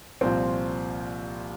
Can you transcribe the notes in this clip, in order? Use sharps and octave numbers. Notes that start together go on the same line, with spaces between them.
C2 A#2 F3 C4